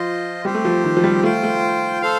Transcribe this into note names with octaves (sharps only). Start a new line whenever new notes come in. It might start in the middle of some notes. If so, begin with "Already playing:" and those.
Already playing: F3 F4 C5 D#5
G3 C4 G4 C5
A3
F3
D#3
F3
G3
A3 F4 C5 G5
A3
A4 C5 F5